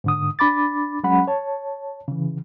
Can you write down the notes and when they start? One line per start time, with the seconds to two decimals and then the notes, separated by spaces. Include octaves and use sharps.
0.04 G#2 D3 D#6
0.39 D4 B5 D6 A6
1.04 F#3 G#3 C#4 F#5 B5
1.27 C#5 A5
2.08 C#3 E3